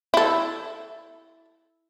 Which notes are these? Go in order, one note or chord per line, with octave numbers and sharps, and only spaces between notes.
E4 A4